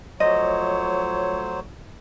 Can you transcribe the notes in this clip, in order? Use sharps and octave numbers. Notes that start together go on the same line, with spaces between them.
F3 F#3 A3 C5 C#5 D#5